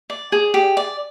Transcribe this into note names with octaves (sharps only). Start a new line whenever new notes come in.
D5
G#4
G4
D5